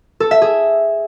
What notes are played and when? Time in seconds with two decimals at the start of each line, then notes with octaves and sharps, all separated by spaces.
0.20 A4
0.31 E5
0.42 G#4